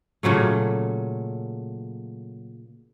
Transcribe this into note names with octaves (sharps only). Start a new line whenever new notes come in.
A#2 C#3 F#3 A3